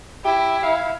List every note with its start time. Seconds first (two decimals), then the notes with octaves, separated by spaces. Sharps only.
0.25 E4 G4
0.63 F5